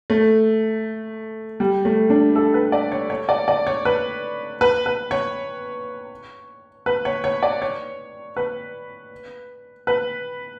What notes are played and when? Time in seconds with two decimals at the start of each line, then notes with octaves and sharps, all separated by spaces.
0.10 A3
1.60 G3
1.85 A3
2.10 D4
2.35 A4
2.54 B4
2.72 D5
2.92 C#5
3.10 C#5
3.29 D5
3.48 D5
3.67 C#5
3.85 B4
4.61 B4
4.86 B4
5.11 C#5
6.86 B4
7.05 C#5
7.24 C#5
7.43 D5
7.62 C#5
8.36 B4
9.87 B4